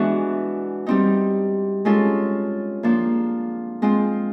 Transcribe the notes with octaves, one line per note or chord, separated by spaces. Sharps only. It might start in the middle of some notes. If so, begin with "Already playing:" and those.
Already playing: E3 G#3 B3 D4 F#4
G3 C4 D#4
G#3 C#4 F4 A4
F3 A#3 D4
G#3 C4 F4